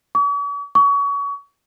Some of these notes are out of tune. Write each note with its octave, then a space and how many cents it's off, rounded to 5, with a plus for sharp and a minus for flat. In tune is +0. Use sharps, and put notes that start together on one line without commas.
C#6 +45
C#6 +30